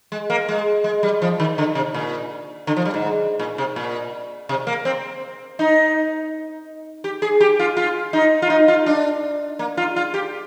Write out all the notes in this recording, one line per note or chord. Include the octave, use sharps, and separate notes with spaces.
G#3
A#3
G#3
G#3
G3
F3
D#3
D3
C3
A#2
D3
F3
G3
G#2
A#2
C3
A#2
C3
A#3
C4
D#4
G4
G#4
G4
F4
F4
D#4
F4
D#4
F4
D4
A#3
F4
F4
G4